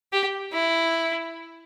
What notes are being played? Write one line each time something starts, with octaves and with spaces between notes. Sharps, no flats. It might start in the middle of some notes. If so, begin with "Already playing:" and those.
G4
E4